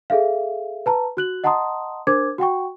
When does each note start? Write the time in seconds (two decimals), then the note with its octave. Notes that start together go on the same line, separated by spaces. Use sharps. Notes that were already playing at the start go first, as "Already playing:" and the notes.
0.10 G#4 A4 E5 F5
0.86 B4 A5 A#5
1.17 F#4 F#6 F#7
1.44 D#5 F#5 A5 A#5 C6 D#6
2.07 D4 A#4 C5 D6 G#6
2.38 F#4 F#5 G5 C#6